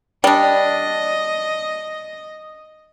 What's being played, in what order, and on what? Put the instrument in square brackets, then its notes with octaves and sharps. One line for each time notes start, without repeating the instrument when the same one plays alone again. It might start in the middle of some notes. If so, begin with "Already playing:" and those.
[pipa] G3 D4 [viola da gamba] D#5